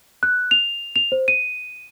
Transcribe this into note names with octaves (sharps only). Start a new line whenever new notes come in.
F#6
F7
F7
C5
D#7